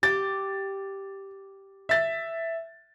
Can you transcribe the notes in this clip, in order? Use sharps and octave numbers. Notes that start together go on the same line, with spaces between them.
G4 A6
E5 A6